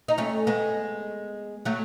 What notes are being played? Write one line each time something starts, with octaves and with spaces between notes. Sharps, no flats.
D#4
A3 C#4
G#3 B3
F#3 A3